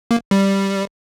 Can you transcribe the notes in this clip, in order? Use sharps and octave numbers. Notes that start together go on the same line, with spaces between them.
A#3
G3